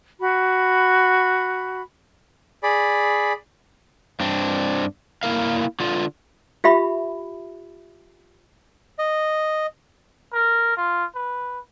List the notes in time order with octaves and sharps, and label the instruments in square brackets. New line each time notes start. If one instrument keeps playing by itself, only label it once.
[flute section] F#4 B5
[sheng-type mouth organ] G#4 D5 B5
[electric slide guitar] G2 C4 D4
A#3 E4 A#4 F5
D3 F4
[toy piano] F4 G4 E5 B5
[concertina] D#5
[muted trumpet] A#4
F4
B4